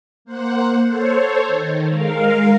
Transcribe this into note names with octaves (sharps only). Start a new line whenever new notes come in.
A#3 C5 F#5
A4 C5 C#5
D#3
G#3 A#4 F5